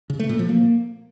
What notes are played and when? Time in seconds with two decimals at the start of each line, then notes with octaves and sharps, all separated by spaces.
0.10 C#3
0.19 A3
0.29 A#2
0.39 F3
0.49 A#3